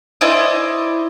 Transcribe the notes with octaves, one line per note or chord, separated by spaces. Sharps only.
E4 C5 D5 D#5